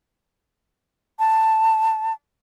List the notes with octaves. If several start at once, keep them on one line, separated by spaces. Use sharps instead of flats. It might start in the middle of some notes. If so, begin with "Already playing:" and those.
A5